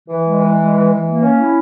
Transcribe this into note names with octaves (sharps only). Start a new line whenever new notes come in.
E3
G#3
E3
G#3
E3
E3
A#3
C#4
E4